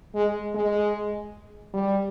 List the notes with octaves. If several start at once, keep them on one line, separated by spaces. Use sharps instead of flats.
G#3
G#3
G3